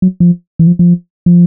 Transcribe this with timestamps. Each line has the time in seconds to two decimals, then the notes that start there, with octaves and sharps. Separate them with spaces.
0.02 F#3
0.20 F3
0.59 E3
0.67 F3
0.79 F3
1.26 F3